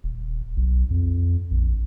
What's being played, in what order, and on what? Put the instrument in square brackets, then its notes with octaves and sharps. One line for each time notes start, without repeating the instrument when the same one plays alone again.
[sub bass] D#1
B1
F2
A#1